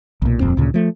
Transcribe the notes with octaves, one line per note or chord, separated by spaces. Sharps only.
B1 A#2
D#1 F2 C4
D2 A#2 C#3
F3 A3